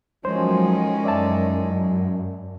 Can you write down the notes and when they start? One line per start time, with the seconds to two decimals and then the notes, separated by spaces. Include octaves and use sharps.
0.25 A2 D#3 F3 F#3 G#3 C#4 C5
1.04 F#2 D5 E5 A5